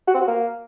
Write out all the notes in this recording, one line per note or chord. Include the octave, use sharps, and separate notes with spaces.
F#4
C4
F#4
A#3